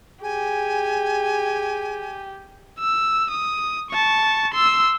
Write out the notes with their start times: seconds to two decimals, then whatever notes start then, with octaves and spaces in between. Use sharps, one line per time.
0.23 G4 G#4 G#5
2.79 E6
3.31 D#6
3.91 A5 C#6
4.54 C6 E6